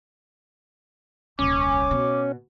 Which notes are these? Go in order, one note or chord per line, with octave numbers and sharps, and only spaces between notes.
D#1 C2 C#4 D6
B2